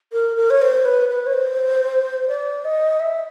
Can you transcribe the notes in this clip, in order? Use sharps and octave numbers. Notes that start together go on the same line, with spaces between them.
A#4
A#4
C#5
C5
B4
B4
C#5
C5
D5
D#5
E5